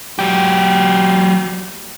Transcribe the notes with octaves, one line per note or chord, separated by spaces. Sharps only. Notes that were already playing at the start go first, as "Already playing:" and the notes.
F#3 G4